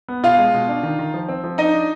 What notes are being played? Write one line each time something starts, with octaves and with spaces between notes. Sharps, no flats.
B3
B2 F4 F5
G#3
B2
D4
D#3
D#3
F3
C4
F3
D4 D#4 D#5
D4